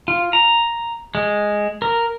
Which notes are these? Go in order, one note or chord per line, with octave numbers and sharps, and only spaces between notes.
F4
A#5
G#3
A#4